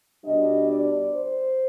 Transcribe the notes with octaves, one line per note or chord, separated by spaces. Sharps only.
B2 G3 D4 D#5
D5
C5